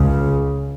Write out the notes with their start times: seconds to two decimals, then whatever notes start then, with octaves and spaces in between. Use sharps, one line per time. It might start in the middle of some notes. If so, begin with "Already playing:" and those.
Already playing: C#2 C#3